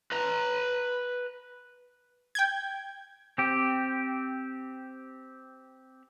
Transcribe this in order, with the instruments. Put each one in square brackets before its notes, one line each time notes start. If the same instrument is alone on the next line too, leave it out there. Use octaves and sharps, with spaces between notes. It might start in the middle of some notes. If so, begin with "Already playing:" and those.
[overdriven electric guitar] B4 A#5
[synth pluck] G5 G6 G#6
[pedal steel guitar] C4 G4